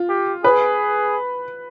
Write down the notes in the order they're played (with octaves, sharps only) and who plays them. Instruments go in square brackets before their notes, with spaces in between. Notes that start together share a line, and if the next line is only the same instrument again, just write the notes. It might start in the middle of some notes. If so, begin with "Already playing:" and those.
Already playing: [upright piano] F4
[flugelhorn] G4
[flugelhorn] G#4 [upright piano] B4